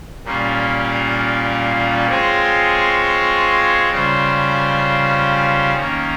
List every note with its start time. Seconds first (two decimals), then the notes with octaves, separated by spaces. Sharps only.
0.24 A#2 G3 A#3 C#4 F4
2.08 G#3 C4 F4 G#4 C#5
3.90 C#3 G3 C#4 F4 C5
5.73 D#3 A#3 C#4